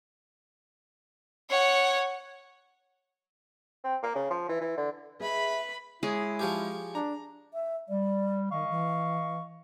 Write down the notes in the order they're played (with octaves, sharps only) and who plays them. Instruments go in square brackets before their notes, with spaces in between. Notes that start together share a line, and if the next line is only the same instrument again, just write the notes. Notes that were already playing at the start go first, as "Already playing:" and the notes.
[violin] C#5 F#5
[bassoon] C4
A#3
C#3
F3
E3
E3
D3
[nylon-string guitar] G#4 D#5 E5 [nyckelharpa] B4 B5
[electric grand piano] G#3 C#5 [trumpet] E4 [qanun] G#4
[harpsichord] F3 C#4 G4
[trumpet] D4 [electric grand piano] A#5
[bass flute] E5
[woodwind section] G3 [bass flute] D5
[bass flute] D#3 [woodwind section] D#5 F5 C#6
[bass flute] E3